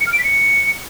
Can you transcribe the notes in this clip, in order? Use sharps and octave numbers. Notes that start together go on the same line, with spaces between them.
C#7
F6
D7
B6
C#7